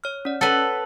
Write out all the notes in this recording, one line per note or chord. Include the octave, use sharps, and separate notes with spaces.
C#5 F6
C#4 D5
A4 B4 C#5 F#5 A5